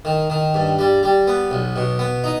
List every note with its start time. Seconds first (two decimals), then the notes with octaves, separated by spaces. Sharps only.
0.05 D#3
0.30 D#3
0.54 G2
0.79 G3
1.03 G3
1.27 B3
1.51 B1
1.76 B2
1.99 B3
2.24 D#4